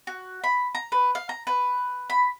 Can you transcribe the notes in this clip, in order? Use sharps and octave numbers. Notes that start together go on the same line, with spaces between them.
F#4
B5
A#5
B4
F5
A#5
B4
B5